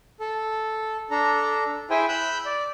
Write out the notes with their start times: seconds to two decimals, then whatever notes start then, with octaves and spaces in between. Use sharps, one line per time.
0.20 A4
1.11 D4 A4 A#5
1.90 E4 G#4 C5 G5 G#5
2.08 B5 E6 F#6 G6
2.46 D5